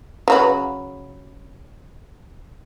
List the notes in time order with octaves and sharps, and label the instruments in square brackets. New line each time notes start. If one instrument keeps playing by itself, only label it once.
[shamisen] C#3 F#3 B4